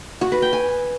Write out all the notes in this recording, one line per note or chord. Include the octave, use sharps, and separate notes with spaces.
F#4
B4
G5
G#5